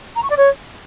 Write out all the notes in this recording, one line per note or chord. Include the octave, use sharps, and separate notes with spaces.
A#5
C#6
D5
C#5